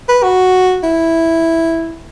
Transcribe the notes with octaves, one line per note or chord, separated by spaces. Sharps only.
B4
F#4
E4